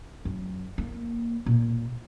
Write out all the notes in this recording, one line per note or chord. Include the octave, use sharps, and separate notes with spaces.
F#2
A#3
A#2